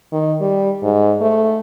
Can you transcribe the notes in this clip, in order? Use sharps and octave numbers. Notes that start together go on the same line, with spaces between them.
D#3
G3
G#2
A3